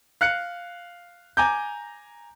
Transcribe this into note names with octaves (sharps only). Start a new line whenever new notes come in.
F5 F#6 C#7
G#5 A#5 D6 G6